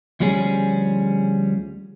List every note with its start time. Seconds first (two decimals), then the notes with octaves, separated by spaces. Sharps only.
0.20 D2 F3 G3 C#4 G#4